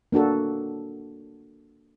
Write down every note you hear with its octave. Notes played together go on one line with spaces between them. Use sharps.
A#3 D4 F#4 A4